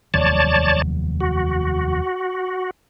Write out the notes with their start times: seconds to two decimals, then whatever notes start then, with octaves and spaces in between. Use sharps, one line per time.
0.14 F1 D#2 F#3 C#5 D5 A5
1.21 F#4